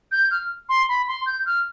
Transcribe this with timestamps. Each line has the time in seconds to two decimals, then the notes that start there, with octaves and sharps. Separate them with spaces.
0.12 G6
0.31 F6
0.69 C6
0.89 B5
1.08 C6
1.26 G6
1.46 F6